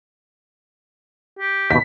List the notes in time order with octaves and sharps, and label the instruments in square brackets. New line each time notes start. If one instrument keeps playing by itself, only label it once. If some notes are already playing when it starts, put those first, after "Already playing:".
[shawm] G4
[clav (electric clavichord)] D#2 B2 [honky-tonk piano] B6